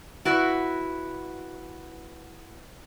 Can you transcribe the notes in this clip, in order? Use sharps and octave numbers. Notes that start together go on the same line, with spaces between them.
E4 F#4 B4